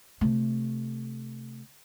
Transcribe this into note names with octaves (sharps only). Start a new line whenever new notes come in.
C3 A3